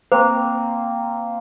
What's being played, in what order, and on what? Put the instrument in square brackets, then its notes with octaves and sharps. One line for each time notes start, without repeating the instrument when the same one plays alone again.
[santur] A#3 C4 [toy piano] C5